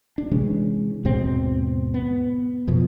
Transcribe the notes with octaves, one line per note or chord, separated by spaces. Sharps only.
D4
C3 E3 G#3 C#4
D#2 G#2 B2 C4
B3
F2 B2 F3